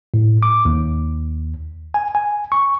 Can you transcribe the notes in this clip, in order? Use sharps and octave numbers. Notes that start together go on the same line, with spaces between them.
A2
D6
D#2
G#5
G#5
C#6